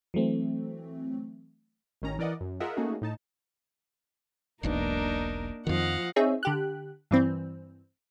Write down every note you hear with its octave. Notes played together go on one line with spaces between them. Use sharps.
E3 F#3 A3 C4
A1 D#3 C#4 A#5
E3 A#4 D5 D#5 F#5
F#2
F4 G#4 A#4 D#5 E5 F#5
A3 A#3 C#4 D#4 F#4 G#4
A2 D#4 A5
E1 B1 B2 A#3 D4 D#4 A#4
F2 D#3 F3 D#5 F5 F#5
C4 D#4 G#4 C#5 E5
D3 G4 F#6
G2 E3 C4